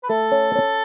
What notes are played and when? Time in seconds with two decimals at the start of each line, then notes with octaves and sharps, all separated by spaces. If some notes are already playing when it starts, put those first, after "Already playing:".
0.04 B4
0.09 A3 A4
0.32 C#4
0.55 C#4